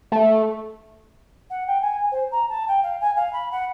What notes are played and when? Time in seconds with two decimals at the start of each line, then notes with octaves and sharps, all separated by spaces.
0.12 A3
1.50 F#5
1.67 G5
1.81 G#5
2.12 C5
2.31 A#5
2.49 A5
2.68 G5
2.83 F5
3.01 G#5
3.16 F5
3.33 B5
3.52 F#5